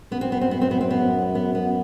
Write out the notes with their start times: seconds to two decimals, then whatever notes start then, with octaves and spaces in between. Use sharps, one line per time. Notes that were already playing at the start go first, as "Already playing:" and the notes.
0.12 F#2 B3
0.21 C4
0.32 B3
0.41 C4
0.51 B3
0.61 C4
0.71 B3
0.81 C4
0.91 B3
1.35 B3
1.55 B3